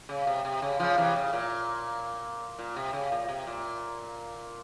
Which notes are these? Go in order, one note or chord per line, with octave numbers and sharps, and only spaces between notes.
C#3
C3
C3
C#3
C#3 F3
C3 E3
C#3
A#2
A#2
C3
C#3
A#2
C3
A#2